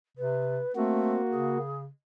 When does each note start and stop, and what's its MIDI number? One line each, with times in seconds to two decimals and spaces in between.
0.18 0.61 48
0.18 0.75 71
0.76 1.17 57
0.76 1.58 58
0.76 1.21 60
0.76 1.58 66
1.31 1.88 49
1.31 1.81 68